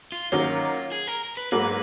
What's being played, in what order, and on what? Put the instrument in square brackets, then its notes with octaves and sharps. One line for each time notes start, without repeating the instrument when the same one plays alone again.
[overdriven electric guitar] F4
[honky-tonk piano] D#3 F#3 A#3 C#4 [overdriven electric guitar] F4
[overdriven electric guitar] G#4
A#4
B4
[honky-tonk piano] G#2 F#3 A#3 [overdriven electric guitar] B4